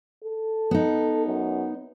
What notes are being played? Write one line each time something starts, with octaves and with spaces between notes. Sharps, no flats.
A4
B3 D#4
F#2